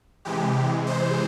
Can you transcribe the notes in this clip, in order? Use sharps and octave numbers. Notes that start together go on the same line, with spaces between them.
C3 E3 G#3 G4
C5